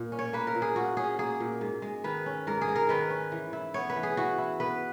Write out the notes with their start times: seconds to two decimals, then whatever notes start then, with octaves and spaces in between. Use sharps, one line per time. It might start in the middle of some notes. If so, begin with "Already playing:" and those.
Already playing: A#2
0.12 C#4
0.19 C#5
0.33 A#3 B4
0.47 A#4
0.55 A#2
0.62 G#4
0.76 A#2 F#4
0.97 C#4 G#4
1.19 A#3 G#4
1.40 A#2
1.61 G#2
1.82 G#3
2.04 D#3 B4
2.26 C#4
2.47 G#2 A#4
2.61 G#4
2.67 G#3
2.75 A#4
2.89 D#3 B4
3.10 C#4
3.32 E3
3.53 E4
3.74 B3 C#5
3.90 B4
3.96 E3
4.03 G#4
4.17 E3 F#4
4.38 E4
4.60 B3 B4